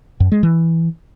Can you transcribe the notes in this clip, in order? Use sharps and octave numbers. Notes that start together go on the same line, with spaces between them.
F#2
G#3
E3